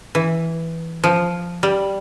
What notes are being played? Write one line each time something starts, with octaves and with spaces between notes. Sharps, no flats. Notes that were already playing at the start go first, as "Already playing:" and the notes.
E3
F3
G3